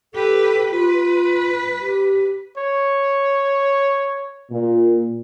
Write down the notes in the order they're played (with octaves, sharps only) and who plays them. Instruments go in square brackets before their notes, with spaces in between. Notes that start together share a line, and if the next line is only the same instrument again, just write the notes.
[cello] G4 B4 [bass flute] A4
[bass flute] F4 [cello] B4
[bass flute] G4
[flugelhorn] C#5
[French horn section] A#2